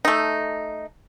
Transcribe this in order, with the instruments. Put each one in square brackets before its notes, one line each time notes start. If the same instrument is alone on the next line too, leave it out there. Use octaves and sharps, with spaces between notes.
[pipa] A3 D#4